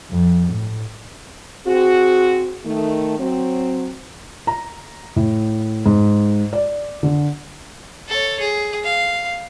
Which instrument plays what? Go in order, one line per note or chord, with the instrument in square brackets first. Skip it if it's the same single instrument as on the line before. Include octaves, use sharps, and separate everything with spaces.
[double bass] F2
A2
[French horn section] C4 F#4 G#4
D#3 A3
F#3 C4
[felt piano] A#5
A2
G#2
D5
D3
[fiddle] A4 C#5
G#4
F5